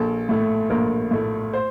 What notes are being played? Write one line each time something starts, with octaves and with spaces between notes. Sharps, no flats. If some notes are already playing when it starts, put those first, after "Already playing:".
Already playing: A#1 A4
A2 A3
A#1 A#4
A2 A3
C5